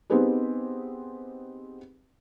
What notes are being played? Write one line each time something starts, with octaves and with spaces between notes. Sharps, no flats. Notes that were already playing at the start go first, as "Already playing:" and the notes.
B3 C4 D#4 G4 G#4 B4